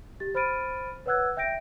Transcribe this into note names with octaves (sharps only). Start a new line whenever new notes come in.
G4 A6
C5 B5 F6 A6 D7 D#7
B4 C#5 F#5 E6 F#6 G#6
E5 G5 G6 A#6 D7